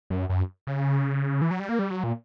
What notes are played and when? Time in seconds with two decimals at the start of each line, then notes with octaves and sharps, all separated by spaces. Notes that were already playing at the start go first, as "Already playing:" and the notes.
0.10 F#2
0.29 F#2
0.67 C#3
1.42 E3
1.51 F#3
1.60 G3
1.69 A#3
1.79 G3
1.91 F#3
2.04 A#2